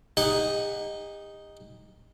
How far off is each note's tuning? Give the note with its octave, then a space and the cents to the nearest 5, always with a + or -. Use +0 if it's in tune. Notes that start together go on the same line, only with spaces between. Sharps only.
D#4 +0 G4 +45 F#5 +0